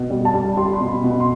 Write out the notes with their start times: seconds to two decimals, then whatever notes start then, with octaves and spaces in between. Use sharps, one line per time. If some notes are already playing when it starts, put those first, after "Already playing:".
Already playing: B2
0.10 G3
0.25 A5
0.34 G3
0.57 G3 C6
0.66 B5
0.74 C6
0.80 B2
0.88 B5
1.04 B2
1.11 B5
1.20 C6